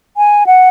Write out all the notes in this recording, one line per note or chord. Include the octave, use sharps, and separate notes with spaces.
G#5
F#5